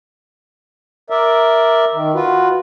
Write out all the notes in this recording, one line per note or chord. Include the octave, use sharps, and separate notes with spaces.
A#4 D5 E5
D#3
F4 F#4 B4